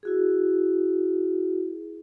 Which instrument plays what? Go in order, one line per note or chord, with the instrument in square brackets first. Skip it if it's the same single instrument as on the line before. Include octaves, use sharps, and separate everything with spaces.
[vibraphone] E4 F#4 G#4